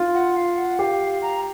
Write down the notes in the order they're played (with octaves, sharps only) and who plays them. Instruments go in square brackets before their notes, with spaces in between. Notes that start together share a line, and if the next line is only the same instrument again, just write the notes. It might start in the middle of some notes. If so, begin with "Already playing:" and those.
Already playing: [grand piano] F4
[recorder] F#5
F5
F#5
[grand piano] G4 [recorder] F5
[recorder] A#5